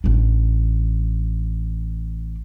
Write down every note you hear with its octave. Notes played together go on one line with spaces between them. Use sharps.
A1 D4